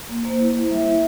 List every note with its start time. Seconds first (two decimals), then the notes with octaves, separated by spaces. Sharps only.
0.09 A#3
0.25 A#3 C5
0.40 E4
0.56 E4
0.71 G3 E5
0.86 E4